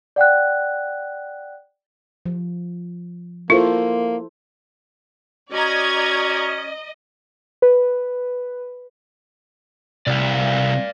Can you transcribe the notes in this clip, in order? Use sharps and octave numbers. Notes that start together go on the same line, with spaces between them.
D5 F#5 G5 F#6
F3
A#3 E4 F4 A4 C5
C#4 F#4 D5 D#5 A#5 G#6
B4
C2 D5 F5